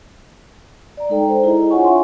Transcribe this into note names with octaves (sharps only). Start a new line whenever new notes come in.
D5 A#5
G#3 D#4 A4 G5
C5 A#5
E4 G#4 D#5
D4 F4 C#5 F#5 G#5 C#6
E5 G#5 C6